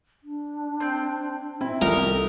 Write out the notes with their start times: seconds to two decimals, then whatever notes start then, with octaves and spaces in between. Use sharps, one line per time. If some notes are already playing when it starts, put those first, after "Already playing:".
0.23 D4
0.80 C4 G6
1.61 C4 E4
1.81 C2 D#4 A4 A#4